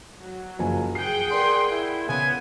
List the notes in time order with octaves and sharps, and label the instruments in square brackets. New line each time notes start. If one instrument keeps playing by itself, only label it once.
[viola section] F#3
[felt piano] F#1 F3 G#5
[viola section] G#4 F#5 G5 [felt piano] C7
[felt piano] A#4 D5 [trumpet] C6
[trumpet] E4
[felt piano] C#3 [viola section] B3 [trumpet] G#5